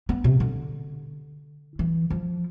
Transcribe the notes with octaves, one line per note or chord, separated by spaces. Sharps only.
B3
C3
D3
E3
F3